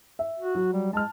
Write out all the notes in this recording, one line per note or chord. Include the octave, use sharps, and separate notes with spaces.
E5
F#4
F#3
G3
G#3 A5 F6